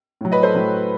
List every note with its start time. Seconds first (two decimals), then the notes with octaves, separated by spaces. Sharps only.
0.21 A2 F#3
0.32 B4 D#5
0.43 A4 C5
0.55 A2 F#3